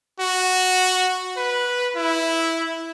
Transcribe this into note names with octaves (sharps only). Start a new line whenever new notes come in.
F#4
B4
E4